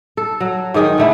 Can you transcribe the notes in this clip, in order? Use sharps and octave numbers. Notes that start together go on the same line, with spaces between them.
A4
F#3
G#2 D#3 G#4 G5
D3 A3 E4